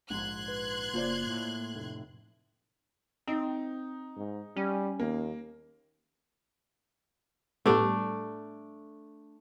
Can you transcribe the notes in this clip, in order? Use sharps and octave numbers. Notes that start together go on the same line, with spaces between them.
A#1 G#2 C6 F#6 G#6
B4
F#1 A#3 F4 C5 D5
A2
F1
C4 D#4
G#2
G3 C#4
D#2 A#3
A2 G3 A3 B3 D4